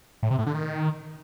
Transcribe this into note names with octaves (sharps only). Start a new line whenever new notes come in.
A2
C3
A2
D3
D#3